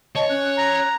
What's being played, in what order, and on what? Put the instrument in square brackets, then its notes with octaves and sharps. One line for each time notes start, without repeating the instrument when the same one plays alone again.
[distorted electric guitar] C#5 [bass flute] D#5 [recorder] A5
[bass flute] C#4 [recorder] F#6
[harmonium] A#5